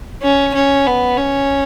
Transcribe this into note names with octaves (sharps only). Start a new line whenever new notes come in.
C#4
C#4
B3
C#4